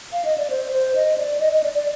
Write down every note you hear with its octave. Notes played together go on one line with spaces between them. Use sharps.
F5
D#5
D5
C5
C5
D#5
D5
D#5
D#5
D5
D5